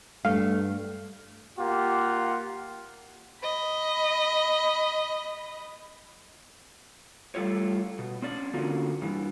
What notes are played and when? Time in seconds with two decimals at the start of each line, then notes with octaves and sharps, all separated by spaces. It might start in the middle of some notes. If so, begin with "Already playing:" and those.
0.25 G2 A3 F5
1.58 A#3 F4 G4 F#5
3.41 D#5 B5
7.35 G3 A3 F4 C#5
7.99 B2
8.22 C4 C#4 D5
8.54 D3 A#3 C#4 F4 F#4
9.02 G2 E3